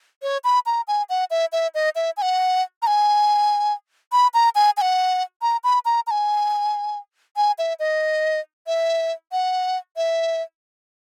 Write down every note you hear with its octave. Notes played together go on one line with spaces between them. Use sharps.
C#5
B5
A#5
G#5
F#5
E5
E5
D#5
E5
G#5
F#5
A#5
G#5
B5
A#5
G#5
G#5
F#5
A#5
B5
A#5
A#5
G#5
G#5
E5
D#5
E5
F#5
E5